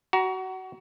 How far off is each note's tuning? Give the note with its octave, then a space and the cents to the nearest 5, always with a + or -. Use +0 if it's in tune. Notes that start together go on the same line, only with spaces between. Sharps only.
F#4 +25 A#5 +20